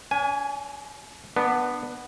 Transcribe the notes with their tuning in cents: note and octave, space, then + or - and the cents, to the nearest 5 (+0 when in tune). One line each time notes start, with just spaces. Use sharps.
C#4 +45 G#5 +0
B3 +0 D4 +25